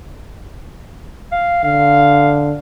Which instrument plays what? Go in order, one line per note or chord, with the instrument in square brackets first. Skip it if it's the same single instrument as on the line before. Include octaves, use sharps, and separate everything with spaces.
[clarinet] F5
[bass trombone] D3 [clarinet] F5